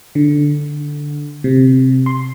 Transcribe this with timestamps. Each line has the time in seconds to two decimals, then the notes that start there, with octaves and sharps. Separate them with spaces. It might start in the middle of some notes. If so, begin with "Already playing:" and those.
0.15 D3
1.44 C3
2.06 C6